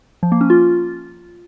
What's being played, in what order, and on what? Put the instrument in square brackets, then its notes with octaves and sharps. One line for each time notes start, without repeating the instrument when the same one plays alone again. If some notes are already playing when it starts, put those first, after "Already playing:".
[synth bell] F3
A#3
C#4
F4